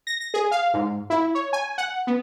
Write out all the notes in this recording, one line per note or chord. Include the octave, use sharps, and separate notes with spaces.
A#6
A#6
G#4
F5
G#2
E4
C#5
G#5
F#5
B3